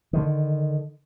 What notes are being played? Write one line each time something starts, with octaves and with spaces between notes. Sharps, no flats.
D3 D#3